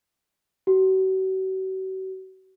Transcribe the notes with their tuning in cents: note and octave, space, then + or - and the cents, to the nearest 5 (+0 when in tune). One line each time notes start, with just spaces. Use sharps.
F#4 +40